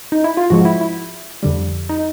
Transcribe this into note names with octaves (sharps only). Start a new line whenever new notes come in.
D#4
E4
F4
G#2 F3 G#3 F#4
E4
E4
F2 D3 G3
D#4